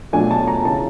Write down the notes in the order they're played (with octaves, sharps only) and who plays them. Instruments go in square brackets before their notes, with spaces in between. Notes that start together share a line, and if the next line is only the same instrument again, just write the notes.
[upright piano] B2 F#3 A3 D4 F4 G#5
A5
A#5
C#3 E3 A5